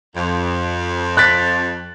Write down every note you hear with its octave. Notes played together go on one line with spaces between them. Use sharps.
F2
F#6 A6 B6